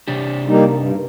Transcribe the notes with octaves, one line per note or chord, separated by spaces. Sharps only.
C3 D4 G4
G3 A#3 D#4
G2